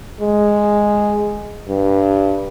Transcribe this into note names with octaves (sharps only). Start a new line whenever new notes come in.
G#3
G2